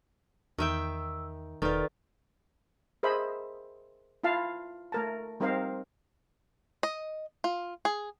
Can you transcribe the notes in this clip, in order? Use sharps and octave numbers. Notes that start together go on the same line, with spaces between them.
E2 D#3 E5 G5 E6
E1 D#3 F4 A4 B4 D5
G#4 A#4 C5 D#5 E5 B5
E4 F4 F5 A5
A3 A#4 A5
G3 C4 D#4 A#4 C5 F5
D#5
F4
G#4